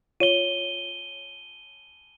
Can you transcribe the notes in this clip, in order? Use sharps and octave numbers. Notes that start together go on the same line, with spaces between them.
F4 C#5 D#7 G7